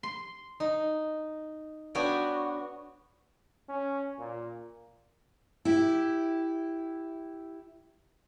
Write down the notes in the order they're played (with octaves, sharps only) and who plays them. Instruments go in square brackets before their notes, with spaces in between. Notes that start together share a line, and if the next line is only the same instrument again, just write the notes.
[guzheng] C6
D#4
B3 D4 F#4 C#5 F#5 G5
[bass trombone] C#4
A#2
[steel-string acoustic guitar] E4 G4